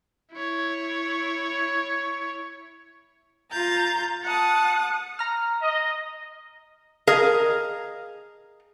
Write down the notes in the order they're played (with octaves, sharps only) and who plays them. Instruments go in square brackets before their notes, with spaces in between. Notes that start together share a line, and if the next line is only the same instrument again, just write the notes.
[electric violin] E4 C#5
[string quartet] F4 A#5 G6 A6
F#5 A5 D#6
[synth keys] A#5 F6
[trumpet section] D#5
[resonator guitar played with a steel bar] G#4 A#4 D#5 F5